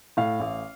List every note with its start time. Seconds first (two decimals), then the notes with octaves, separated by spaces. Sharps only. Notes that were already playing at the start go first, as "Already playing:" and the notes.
0.17 A2 F5
0.39 A1